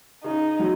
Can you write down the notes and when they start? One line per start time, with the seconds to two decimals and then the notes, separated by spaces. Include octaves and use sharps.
0.24 C#3 D#4
0.60 F#3